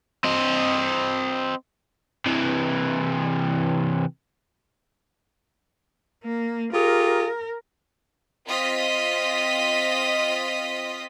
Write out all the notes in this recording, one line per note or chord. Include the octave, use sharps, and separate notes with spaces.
C4 D#5
C3 E3
A#3
F4 G4 G#4 A#4
C4 F4 D#5 B6